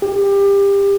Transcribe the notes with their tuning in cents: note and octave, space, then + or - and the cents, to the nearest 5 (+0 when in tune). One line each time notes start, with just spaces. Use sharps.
G4 +25